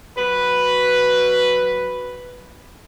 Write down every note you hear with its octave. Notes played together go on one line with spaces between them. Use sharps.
F#3 F#4 B4